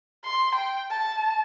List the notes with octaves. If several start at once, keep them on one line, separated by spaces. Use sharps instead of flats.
C6
G5
A5